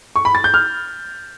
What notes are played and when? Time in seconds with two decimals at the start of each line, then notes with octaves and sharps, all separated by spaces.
0.16 C#6
0.25 B5
0.35 A6
0.44 G6
0.54 F6